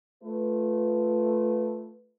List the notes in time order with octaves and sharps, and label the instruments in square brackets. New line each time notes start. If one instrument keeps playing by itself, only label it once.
[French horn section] A3 F4 B4